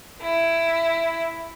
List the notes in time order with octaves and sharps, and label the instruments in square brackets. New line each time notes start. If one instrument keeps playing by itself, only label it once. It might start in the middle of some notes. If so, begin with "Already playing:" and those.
[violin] E4